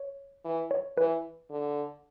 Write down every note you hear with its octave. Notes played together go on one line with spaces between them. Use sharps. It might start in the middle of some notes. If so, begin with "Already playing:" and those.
Already playing: C#5
E3
C#5
E3 B4
D3